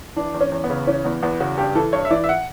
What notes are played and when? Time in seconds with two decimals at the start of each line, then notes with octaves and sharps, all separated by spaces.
0.16 E3 D4
0.34 E2
0.41 C#4
0.52 E2
0.64 B3
0.70 C#3
0.87 E3 C#4
1.05 E2 B3
1.23 E2 B3
1.40 C#3 F#4
1.58 G2 G4
1.75 E3 A4
1.93 G2 C#5
2.05 E5
2.11 E3 D5
2.24 E5
2.29 F#5